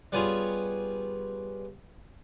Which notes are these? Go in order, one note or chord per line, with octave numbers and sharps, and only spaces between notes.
G3 B3 C#4 F4 G#4